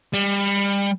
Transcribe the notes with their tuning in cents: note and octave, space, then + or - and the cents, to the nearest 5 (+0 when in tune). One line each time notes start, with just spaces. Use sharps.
G3 +30